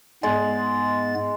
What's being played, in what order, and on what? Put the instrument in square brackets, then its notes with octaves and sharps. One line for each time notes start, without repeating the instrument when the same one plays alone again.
[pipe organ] G#2 B3 A6 [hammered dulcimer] G#3